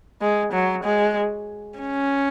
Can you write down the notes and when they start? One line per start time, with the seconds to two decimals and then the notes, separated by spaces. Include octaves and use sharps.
0.21 G#3
0.53 F#3
0.84 G#3
1.79 C#4